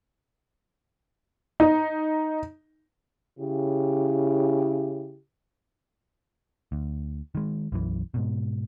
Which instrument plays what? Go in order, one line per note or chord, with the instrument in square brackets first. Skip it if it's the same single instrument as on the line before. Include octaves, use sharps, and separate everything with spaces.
[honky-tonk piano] D#4
[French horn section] C#3 E4 G4
[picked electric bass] D2
D#3 G#3
B1 F#2 E3
G#2 B2